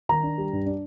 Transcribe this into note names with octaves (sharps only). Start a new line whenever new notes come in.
D#3 A#5
D4
G3
G2
D4